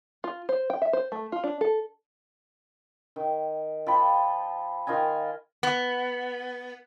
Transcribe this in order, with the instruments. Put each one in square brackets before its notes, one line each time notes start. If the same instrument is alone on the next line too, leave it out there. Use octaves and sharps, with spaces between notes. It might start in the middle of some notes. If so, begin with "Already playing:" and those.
[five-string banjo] F4
C5
G5
E5
C5
A3
F4
D4
A4
[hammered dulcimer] D#3
F3 G5 B5
D#3 F4 D#5 G#5
[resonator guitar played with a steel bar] B3